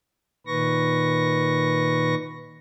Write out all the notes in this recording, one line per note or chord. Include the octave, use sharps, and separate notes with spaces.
A#2 D#3 B4 C#6 A#6